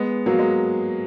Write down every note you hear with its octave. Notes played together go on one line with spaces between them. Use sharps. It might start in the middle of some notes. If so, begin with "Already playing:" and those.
Already playing: G#3 B3
F#3 A#3
G#3